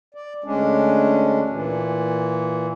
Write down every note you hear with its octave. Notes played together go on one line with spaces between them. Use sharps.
D5
D2 G#3 C#4 D4
A#2 E3